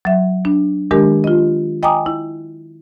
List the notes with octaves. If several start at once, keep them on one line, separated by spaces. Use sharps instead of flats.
F#3 E5
D4
D#3 G#3 D4 G4 A#4
F4 D#5
D#5 G5 G#5 A#5 D6 D#6
E4